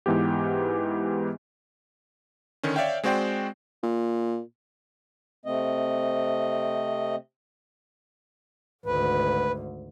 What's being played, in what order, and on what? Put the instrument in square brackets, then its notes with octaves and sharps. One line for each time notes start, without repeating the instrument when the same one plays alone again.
[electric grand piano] G#2 E3 B3 G4
D3 D#3 C#4
C#5 D5 E5 F5 G5
G#3 C4 F#4 C5 D5 G5
[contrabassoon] A#2
[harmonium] C3 A3 C4 D#5
[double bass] G#1 D2 [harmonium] B4